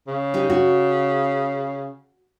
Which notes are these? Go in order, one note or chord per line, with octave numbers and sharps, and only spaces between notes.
C#3
D#4 G4
F#4